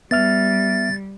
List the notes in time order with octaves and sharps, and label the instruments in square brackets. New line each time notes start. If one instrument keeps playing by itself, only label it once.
[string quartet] G3 [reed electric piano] B3 E5 F6 [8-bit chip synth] A6